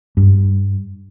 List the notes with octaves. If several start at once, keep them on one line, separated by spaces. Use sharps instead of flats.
G2